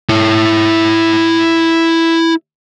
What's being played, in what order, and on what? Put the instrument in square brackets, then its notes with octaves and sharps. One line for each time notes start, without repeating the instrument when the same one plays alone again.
[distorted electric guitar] E4 C#5